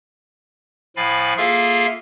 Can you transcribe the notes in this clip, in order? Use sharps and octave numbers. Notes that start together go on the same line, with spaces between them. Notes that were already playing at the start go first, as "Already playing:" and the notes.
A2 F3 F5 G#5 B5 A6
A#3 F4 G#4 A4 E5 F5